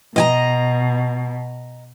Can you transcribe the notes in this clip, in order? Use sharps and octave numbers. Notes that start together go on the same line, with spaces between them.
B2 D#5 G#5 A#5